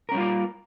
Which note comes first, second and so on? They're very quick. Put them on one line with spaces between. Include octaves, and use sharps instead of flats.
A#4 C#4 G3 F4 A#3